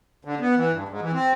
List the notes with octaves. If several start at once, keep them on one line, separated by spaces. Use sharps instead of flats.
D3
B3
E3
G2
G#2
E3
C4